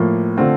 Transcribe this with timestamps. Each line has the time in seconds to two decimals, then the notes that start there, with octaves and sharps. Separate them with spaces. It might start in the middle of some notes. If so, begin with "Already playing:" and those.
Already playing: A2 F3 A#3
0.37 D3 A3 C4 F4